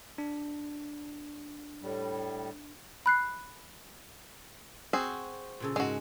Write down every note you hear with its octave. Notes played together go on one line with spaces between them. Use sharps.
D4
A2 G3
B5 F#6 C7
C4 F#4 G#4
A#2 C#3 A4
G#2 G#3 C#4 F#4